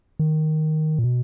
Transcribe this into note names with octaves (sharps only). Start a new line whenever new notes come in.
D#3
A#2
B2